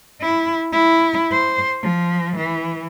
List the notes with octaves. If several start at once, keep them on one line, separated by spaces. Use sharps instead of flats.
E4
E4
C5
F3
E3